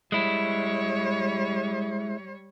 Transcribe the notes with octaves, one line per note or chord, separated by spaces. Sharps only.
G3 G#3 E4 C#5